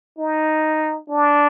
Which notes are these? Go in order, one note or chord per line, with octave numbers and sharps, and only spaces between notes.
D#4
D4